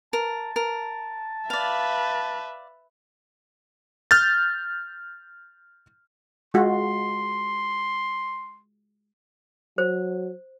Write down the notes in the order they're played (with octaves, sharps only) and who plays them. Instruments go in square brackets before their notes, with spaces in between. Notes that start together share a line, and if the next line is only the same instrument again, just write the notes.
[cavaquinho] A#4 [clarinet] A5
[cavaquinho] A#4
[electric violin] B4 E5 [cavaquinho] D5 F5
[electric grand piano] F6 G6 A6
[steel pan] G#3 F4 F#4 [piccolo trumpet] C6
[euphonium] F#3 [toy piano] C5